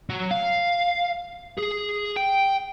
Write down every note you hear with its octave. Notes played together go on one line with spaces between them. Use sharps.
F#3
F5
G#4
G5